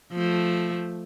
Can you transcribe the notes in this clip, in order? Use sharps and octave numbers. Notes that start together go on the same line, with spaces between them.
F3 A3